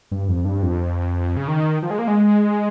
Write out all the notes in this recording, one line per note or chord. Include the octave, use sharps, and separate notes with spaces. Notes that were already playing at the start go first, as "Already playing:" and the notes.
G2
F2
G2
F2
C#3
D#3
F3
G#3
A#3
G#3